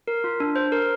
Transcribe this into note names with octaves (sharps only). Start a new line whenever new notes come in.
A#4
F4
D4
C5
A#4